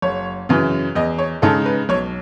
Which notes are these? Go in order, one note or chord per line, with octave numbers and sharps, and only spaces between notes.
F#1 C#5
F#2 C#3 E3
E2 D#5
C#5
C#3 G#3 D#4 A4
B4
B1 C#5